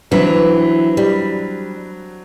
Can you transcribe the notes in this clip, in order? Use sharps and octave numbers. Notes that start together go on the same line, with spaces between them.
D3 E3 F#3 C4
G3